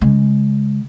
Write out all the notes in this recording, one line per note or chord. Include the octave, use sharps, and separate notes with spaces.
C#3 G#3